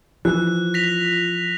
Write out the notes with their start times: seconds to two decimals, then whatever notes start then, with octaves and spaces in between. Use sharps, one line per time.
0.25 E3 F3 F#6
0.74 A#6 B6 F7